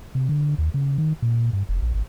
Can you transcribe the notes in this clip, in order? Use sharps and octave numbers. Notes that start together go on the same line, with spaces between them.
C3
D3
D#2
C#3
D#3
A#2
G2
F1
A#1
G#1